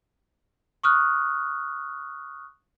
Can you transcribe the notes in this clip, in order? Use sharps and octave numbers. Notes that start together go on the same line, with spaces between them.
C#6 D#6 F6 F#6